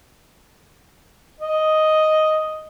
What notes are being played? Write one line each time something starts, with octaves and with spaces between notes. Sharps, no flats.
D#5